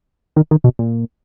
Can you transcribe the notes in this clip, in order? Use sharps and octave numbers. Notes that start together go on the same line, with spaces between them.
D#3
D#3
B2
A#2